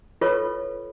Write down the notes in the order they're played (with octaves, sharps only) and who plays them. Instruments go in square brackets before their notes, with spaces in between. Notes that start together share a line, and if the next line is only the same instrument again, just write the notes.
[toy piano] F4 A4 B4 C#5